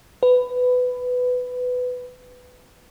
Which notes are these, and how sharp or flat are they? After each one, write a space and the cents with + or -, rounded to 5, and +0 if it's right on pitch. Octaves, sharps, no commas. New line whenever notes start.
B4 +15